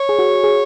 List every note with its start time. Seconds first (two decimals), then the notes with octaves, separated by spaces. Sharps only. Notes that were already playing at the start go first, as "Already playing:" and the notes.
Already playing: C#5
0.09 G#4
0.19 F#4
0.44 G#4